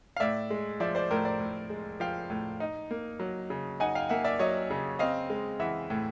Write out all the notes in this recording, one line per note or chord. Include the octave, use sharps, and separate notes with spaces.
F5
A2 D5 E5
G#3
F3 D5 E5
C5 D5
A2 A#4 C5
C5 D5
A2
G#3
F3 F5 G5
A2
D#4
A#3
F#3
C#3
D#4 F#5 G#5
F5 G5
A#3 E5 F#5
D5 E5
F#3 C#5 D#5
C#3
C4 D#5 F5
G#3
E3 E5 F#5
A2